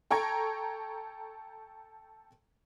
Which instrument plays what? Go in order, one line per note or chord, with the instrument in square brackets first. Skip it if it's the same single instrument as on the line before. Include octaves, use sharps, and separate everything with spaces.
[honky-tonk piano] A4 G5 A#5 C#6 G#6